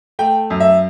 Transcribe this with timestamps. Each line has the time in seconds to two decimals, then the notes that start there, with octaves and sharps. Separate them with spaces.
0.19 A3 G5
0.50 F#2
0.60 E5